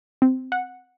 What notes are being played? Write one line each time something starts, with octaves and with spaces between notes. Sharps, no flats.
C4
F#5